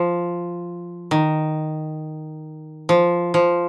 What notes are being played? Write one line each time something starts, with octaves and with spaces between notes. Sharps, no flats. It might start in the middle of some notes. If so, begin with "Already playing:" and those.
Already playing: F3
D#3
F3
F3